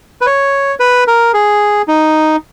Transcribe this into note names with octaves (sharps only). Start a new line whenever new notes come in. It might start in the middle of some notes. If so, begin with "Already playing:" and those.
B4
C#5
B4
A#4
G#4
D#4